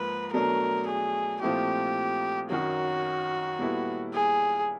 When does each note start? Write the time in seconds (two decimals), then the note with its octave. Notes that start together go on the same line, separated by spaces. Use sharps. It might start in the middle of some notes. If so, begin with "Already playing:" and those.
Already playing: G#2 F3 A#3 B4
0.33 B2 F#3 A3 D4 A#4
0.87 G#4
1.41 A#2 F3 A3 C4 E4 G4
2.50 F#2 D#3 F#3 F#4
3.59 A#2 G3 B3 E4 A4
4.14 G#4